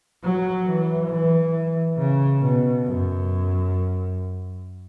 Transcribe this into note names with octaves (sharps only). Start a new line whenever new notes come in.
F#3
E3
E3
C#3
B2
F#2